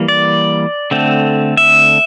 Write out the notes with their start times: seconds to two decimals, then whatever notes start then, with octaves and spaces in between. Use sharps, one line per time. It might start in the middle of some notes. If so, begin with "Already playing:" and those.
Already playing: E3 G3 A#3
0.08 D5
0.91 D3 A3 C4
1.57 E5